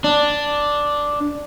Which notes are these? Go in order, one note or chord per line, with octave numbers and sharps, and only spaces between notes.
D4